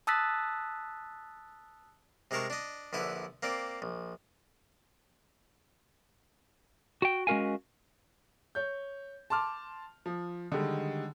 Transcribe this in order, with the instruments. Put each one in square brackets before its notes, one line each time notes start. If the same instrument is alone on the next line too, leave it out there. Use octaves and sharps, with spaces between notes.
[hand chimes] A5 D#6 E6 F#6 A6 B6
[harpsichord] C3 G#3 A#4 A5 C#6
D4 D#5
A#1 D3 E4 B4
A#3 C4 D5
A#1
[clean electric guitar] F#4 G5
G#3 C#4 F#4 A#4 F5 G#5
[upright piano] C#5 G6
A5 C6 D6 F6
F3
D3 D#3 G3 G#3